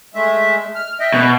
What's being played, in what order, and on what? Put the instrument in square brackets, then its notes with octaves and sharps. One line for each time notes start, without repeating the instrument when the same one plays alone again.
[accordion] G#3 A3 E5
F6
D#5 E5 G5
[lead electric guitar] B2